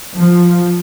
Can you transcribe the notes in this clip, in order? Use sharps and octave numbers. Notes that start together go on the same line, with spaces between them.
F3